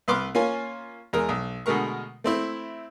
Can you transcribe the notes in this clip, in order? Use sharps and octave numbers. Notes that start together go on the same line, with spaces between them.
C2 B4 C6 D6 F6
A#3 C#4 F4 G#5
E2 G#3 A#4
B1
B2 D3 G#3 A3 A#4 C#6
A3 C4 E4